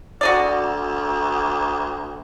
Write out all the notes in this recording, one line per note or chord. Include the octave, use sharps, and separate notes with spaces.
D2 F#4 G#4 D5